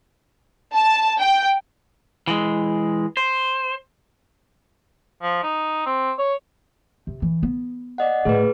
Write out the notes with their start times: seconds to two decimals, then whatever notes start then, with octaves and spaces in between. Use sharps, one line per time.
0.73 A5
1.20 G5
2.27 E3 G#3
3.17 C5
5.22 F3
5.43 D#4
5.86 C4
6.19 C#5
7.07 C3
7.22 E3
7.43 B3
7.98 D5 D#5 F#5
8.25 A2 A3 G#4 B4